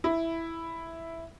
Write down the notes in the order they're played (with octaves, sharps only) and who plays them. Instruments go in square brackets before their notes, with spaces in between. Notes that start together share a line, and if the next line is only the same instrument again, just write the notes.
[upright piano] E4